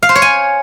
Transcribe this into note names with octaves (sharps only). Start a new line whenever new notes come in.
F5
C5
C#5
G#5